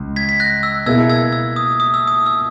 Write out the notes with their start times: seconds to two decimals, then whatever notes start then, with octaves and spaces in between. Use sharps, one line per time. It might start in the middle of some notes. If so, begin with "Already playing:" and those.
Already playing: C#2
0.16 G#6 B6
0.29 B6
0.40 F#6 A#6
0.63 E6
0.86 B2 A#3 E4 G#4 E6 G#6
1.09 E6 G#6
1.32 E6
1.56 D#6
1.80 D#6
1.94 E6
2.08 D#6
2.26 E6